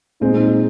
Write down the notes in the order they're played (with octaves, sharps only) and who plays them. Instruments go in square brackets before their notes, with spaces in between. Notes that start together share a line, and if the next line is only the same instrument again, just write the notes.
[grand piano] A#2 G#3 C4 [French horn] D#4